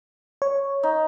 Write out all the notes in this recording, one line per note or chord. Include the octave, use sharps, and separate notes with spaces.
C#5
D#4